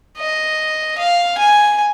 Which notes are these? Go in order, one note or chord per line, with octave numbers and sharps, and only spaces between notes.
D#5
F5
G#5